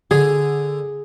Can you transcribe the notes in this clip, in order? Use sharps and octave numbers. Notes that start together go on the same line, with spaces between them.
D3 G#4